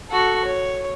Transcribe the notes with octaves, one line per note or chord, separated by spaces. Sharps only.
F#4 A4
C#5